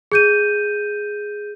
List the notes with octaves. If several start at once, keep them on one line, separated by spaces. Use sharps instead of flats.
G#4 G6 D#7